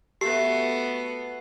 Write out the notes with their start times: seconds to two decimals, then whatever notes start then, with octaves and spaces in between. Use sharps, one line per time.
0.21 A3 B3 F#4 G4 A4 C7